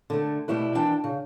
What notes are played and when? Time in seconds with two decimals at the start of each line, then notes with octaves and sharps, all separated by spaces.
0.10 D3 A3
0.48 B2 G3 A3 E4 B4
0.75 D#2 E3 D4 G5 A5
1.04 C#3